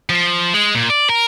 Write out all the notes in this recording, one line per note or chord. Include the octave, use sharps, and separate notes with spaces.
F3
G#3
A#2
D5
A#4